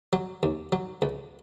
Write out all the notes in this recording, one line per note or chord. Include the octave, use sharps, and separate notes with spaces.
F#3
D#2
F#3
C#2